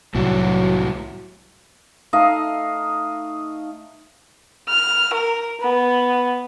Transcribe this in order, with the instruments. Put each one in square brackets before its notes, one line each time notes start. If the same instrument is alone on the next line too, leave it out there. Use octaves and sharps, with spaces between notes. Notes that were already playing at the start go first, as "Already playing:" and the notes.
[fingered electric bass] C2 A2 C3 [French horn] F#3 [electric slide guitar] G3 E4 F#4
[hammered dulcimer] A3 D#4 D#5 F5
[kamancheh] F6
A#4
B3